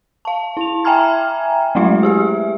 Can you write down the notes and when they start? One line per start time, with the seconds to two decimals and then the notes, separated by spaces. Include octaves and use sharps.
0.25 F5 A5
0.57 E4 F7
0.84 E5 G5 G#5 A#5 F6 G#6
1.75 F#3 G#3 A3 E4 F#4 E5
2.03 G4 G#4 E5